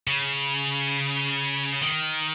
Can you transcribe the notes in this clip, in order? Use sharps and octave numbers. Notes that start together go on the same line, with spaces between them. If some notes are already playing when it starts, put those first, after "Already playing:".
C#3
D#3